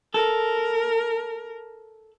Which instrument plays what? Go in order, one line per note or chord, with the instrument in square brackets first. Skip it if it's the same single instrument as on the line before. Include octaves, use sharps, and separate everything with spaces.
[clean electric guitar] A4 [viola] A#4